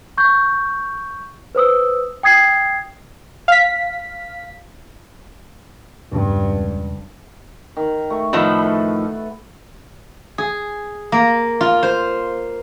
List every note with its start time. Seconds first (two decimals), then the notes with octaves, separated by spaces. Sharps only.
0.18 C#6 G6
1.55 B4 C5 D#6 E6
2.23 G5 D#6 G#6 C7
3.48 F5 B6
6.12 E1 C#2 G2 D4
7.77 D#3
8.10 A3 C#6
8.33 A2 D#3 F3 B4 E5 F#5
8.58 A4 B4
10.38 G#4
11.12 A#3
11.61 F4
11.83 C5